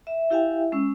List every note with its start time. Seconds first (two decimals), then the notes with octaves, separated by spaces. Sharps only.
0.07 E5
0.30 E4 G4 E5 F5 G5 G#5
0.72 G#3 C#4 E6